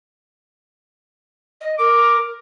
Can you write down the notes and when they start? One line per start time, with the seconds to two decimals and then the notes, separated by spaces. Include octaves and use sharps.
1.61 D#5
1.78 A#4 D6